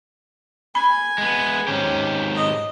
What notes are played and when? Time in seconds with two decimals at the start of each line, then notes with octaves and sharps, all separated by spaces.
0.75 G#5 B5
1.18 G#3 B3
1.68 G#2 D#3 C#4 G4
2.35 D#5